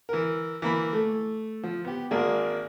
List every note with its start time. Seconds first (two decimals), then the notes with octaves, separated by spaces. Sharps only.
0.09 E3 A#4
0.62 E3 A#3 B5
0.93 A3
1.63 F3
1.85 B3 G4
2.11 G#1 A#3 G#4 D5